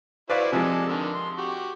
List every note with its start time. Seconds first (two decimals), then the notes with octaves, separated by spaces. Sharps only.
0.30 E4 F#4 B4 C5 D5 F5
0.52 C3 F3 G#3 A4 D5 G#5
0.88 D3 D#3
1.15 C6
1.38 F#4 G4